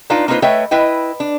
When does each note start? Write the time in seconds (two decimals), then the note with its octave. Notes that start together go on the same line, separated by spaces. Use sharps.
0.10 D4 D#4 F4 B4 F5
0.28 A#3 C4 D#4 F4 B4 C5
0.42 A3 B4 C#5 D#5 E5 G5
0.71 E4 B4 D#5 G5
1.20 D4